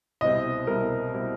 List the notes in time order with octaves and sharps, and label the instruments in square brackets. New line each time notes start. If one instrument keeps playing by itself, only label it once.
[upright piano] C2 B2 G3 C4 E4 [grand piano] D#5
[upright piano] C2 B2 G3 C4 E4 [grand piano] A#4
[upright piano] B2 G3 C4 E4